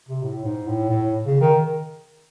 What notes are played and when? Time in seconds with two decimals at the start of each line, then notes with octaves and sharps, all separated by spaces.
0.09 C3
0.23 A2
0.45 G#2
0.67 A2
0.90 A2
1.26 C#3
1.41 D#3